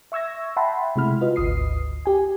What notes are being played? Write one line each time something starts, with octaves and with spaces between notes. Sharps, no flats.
E5 C#6 E6 G#6 A#6
E5 F#5 G5 A5 B5 C6
C3 G#3 A3 E4 B5 F6
F4 F#4 B4 D#5
G#1 D2 D#6 C7
G4 G#5